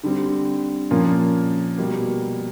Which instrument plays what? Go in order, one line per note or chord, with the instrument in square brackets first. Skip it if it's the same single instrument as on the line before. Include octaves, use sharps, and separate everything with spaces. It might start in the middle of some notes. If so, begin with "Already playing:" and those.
[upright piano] D3 G3 C4
A#2 F3 A#3 C#4 F4
B2 G3 A#3